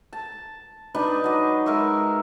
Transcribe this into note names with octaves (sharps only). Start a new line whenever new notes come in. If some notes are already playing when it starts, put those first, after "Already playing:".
A5
D4 D#4 G4 B4
F#3 D#5
G#3 A#4 E5 C#6